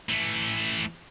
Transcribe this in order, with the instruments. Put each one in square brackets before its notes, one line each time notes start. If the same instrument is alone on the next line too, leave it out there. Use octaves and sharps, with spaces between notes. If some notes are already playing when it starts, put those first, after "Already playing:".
[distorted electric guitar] E3 A3